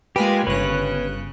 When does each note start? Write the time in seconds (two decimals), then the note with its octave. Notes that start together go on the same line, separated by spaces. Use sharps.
0.16 G#3 A#3 F4 G4 B4 G#5
0.47 G1 C#3 B4 C#5 F#6